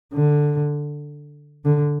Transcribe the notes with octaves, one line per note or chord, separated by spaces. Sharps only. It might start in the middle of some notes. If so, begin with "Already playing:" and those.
D3
D3